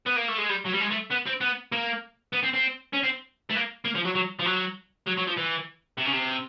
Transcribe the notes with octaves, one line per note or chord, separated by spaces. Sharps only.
B3
A#3
A3
G#3
G3
F#3
G3
G#3
A3
B3
C4
B3
A#3
B3
C4
C4
C#4
C4
A3
A#3
A#3
F3
F#3
F#3
F3
F#3
F#3
F#3
F3
E3
C3
C#3
C3